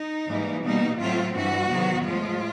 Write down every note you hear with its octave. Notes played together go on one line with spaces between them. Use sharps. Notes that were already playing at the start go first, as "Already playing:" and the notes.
Already playing: D#4
G#2 E3 G3 A#3
B2 G3 A#3 D#4
A2 F#3 A3 C4 F4
G2 E3 G3 F#4
E2 C3 D#3 F#3 B3
A2 F3 G#3 F4